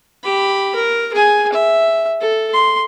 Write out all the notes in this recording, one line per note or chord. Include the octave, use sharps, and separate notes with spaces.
G4 B5
A#4
G#4 G#5
E5
A4
C6